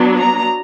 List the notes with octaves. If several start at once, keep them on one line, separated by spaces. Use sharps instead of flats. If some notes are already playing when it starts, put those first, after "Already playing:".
Already playing: F#3 B3 D4
A#5